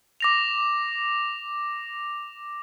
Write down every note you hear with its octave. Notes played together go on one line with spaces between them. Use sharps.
D6 A#6 F7